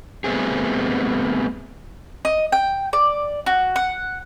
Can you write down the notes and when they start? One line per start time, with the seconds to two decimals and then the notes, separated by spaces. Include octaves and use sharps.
0.24 G3 A3 B3 C4 G#4
2.25 D#5
2.52 G5
2.93 D5
3.46 F#4
3.76 F#5